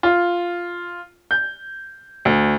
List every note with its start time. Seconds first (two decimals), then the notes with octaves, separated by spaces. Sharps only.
0.03 F4
1.31 G6
2.25 D2